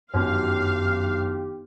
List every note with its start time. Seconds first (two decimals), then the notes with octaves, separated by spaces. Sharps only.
0.14 G1 F#2 D#3 D#4 G4 F5